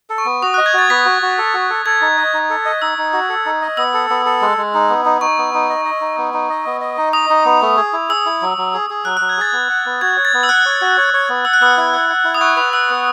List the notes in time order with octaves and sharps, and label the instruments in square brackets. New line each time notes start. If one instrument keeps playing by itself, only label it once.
[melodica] A4
[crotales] C#6
[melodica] B3
[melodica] F#4 [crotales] D#6
[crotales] F#6
[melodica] D#5
[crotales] G#6
[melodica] F#4 [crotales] A6
[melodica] B3 [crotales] B6
[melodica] F#4
F#4
A4
F#4
A4
[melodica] A4 [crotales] G#6
[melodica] D#4
D#5
D#4
A4
D#5
[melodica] D#4 [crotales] E6
[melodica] D#4
F#4
A4
D#4
D#5
[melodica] B3 [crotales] E6
[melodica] A4
B3
A4
G#3
G#3
D#4
B3
D#4
[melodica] D#4 [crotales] C#6
[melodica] B3
D#4
D#5
D#5
D#4
B3
D#4
D#5
B3
D#5
D#4
[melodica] D#5 [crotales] D#6
[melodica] D#4
B3
A3
G#4
E4
[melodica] G#4 [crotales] E6
[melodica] E4
F#3
F#3
G#4
G#4
[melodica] F#3 [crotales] F#6
[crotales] F#6
[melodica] F#3
[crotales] G#6
[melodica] G#4 [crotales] A6
[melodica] B3
F#5
B3
[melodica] F#4 [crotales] G#6
[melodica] C#5
[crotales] A6
[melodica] B3
[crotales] E6
[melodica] F#5 [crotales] F#6
[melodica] C#5
F#4
C#5
C#5
B3
[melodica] F#5 [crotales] E6
[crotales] F#6
[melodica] B3 [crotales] E6
[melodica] E4
F#5
F#5
E4
[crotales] D#6
[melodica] F#5 [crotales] C#6
[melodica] B4 [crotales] D#6
[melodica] F#5 [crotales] E6
[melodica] B3